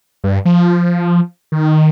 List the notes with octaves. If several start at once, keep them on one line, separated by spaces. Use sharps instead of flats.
G2
F3
D#3